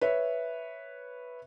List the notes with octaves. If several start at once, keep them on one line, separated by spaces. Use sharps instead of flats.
B4 C#5 E5